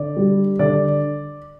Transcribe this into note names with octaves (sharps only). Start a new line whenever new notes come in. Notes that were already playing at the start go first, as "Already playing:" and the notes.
Already playing: D3 D5
G3
D3 D5